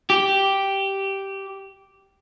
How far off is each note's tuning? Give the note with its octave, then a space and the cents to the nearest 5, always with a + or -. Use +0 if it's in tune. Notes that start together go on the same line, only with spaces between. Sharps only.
G4 -5